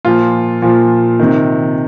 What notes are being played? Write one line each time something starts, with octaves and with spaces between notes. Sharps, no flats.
A#2 F3 F4
A#2 F3
C3 D#3